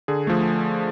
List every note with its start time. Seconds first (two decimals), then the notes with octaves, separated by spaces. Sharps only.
0.08 D3 G#4
0.27 F3 A3